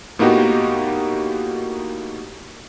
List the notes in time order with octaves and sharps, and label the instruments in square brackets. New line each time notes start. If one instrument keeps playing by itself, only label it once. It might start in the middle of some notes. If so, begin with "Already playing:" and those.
[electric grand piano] A2 A#3 B3 D#4 F#4 G4